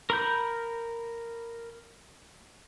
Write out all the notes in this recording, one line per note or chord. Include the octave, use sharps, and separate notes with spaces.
A#4 B5 G6